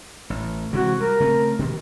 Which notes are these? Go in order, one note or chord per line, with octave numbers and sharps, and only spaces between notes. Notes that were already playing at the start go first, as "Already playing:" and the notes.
A1
C3 E3 G#3 F#4
G3 A#4
C#3 A3 C4
B2 D#3